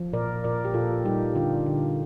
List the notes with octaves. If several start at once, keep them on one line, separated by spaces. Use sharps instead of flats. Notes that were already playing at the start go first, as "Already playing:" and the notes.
Already playing: F3
A#2 A#4 D5
A#2 A#4 D5
G4
A#2 F4 A4
G3 D#4 G4
D3 D4 F4
D3